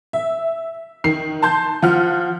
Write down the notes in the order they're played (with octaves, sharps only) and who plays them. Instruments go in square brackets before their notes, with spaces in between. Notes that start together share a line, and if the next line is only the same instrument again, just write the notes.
[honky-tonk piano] E5
[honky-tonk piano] D#3 [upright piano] C7
[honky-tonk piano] A5 C6 G6
[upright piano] F3 [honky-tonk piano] F4 F#5 F6